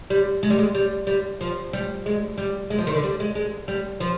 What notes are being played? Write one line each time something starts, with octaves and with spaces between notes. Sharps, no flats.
G3
G#3
G3
G#3
G3
G3
F3
G3
G#3
G3
G#3
F3
D#3
D3
G3
G#3
G#3
G3
F3